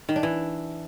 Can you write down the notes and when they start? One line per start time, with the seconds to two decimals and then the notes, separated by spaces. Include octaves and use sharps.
0.09 D#3
0.16 D4
0.23 E3